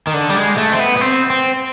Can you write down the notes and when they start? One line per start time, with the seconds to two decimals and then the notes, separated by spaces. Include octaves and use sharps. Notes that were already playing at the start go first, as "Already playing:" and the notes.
0.07 D#3
0.14 D3
0.30 G3
0.36 G#3
0.57 A3
0.72 C4
0.79 B3
0.97 B3
1.01 C4
1.30 C4